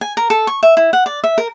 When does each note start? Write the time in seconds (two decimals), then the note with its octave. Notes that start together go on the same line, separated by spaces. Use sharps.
0.01 G#5
0.17 A#4
0.30 A4
0.47 C#6
0.63 E5
0.77 E4
0.93 F#5
1.06 D5
1.24 E5
1.38 A#4